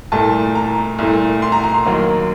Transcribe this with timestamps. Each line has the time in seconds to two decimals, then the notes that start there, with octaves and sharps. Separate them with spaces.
0.12 C2 A#2 A3 A5
0.55 A#5
0.99 C2 A#2 A3
1.42 C6
1.52 A#5
1.64 A#5
1.74 C6
1.86 D#2 D#3 F#3 A#3